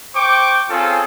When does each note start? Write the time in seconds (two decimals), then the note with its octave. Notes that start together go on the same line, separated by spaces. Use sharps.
0.14 C5 G5 C#6 D6
0.70 C4 C#4 F4 G#4 A4